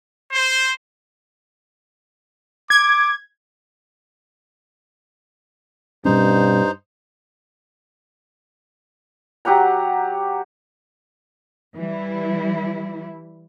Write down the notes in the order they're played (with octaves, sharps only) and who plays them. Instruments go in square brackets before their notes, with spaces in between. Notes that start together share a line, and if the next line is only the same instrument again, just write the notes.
[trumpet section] C5
[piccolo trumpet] D6 [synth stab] G#6
[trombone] G2 [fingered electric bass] B2 G3 C#4 [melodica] D#4 C5
[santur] F#3 G4 F#5 A#5
[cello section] E3 G3 E4